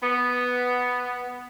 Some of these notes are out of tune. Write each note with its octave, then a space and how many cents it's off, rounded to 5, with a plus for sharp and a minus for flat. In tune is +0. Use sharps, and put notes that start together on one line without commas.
B3 +0